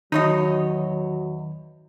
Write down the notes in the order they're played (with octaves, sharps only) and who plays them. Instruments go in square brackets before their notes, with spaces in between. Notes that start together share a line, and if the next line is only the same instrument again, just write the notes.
[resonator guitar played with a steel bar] E2 C#5 D#5 [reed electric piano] D#3 [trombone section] F#3 [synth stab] D#4